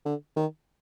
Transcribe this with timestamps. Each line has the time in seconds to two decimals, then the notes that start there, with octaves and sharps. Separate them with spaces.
0.06 D3
0.36 D#3